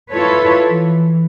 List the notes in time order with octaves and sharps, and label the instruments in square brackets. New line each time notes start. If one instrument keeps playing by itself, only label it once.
[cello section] E4 F4 A4 B4 C#5
E3